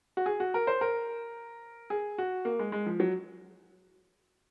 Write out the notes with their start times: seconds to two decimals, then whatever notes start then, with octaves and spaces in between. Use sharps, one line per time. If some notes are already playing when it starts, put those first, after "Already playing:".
0.17 F#4
0.26 G#4
0.40 F#4
0.54 A#4
0.67 C5
0.81 A#4
1.90 G#4
2.18 F#4
2.45 A#3
2.59 G#3
2.72 G#3
2.86 F3
3.00 F#3